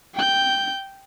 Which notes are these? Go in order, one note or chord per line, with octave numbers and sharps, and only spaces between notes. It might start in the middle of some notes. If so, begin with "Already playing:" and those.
G5 G6